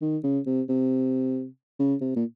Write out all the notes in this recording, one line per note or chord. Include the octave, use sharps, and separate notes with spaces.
D#3
C#3
C3
C3
C#3
C3
A#2